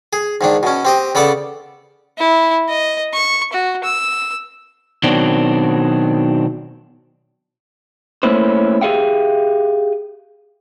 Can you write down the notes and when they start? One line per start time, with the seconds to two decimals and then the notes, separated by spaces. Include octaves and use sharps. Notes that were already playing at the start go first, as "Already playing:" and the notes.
0.13 G#4
0.41 G#2 D#3 D4
0.63 B2 C#4
0.85 C4 G4 D#5
1.15 C#3 B3 A4 D5 A5
2.18 E4
2.69 D#5
3.14 C#6
3.53 F#4
3.84 E6
5.03 B2 D#3 F#3 C4 D4
8.23 A3 A#3 C#4 E4 B4 C5
8.81 G4 G#4 E5 F5 G5